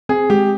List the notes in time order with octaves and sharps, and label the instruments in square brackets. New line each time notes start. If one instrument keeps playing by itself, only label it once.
[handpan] C4 [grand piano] G#4
[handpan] G#3 [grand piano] G4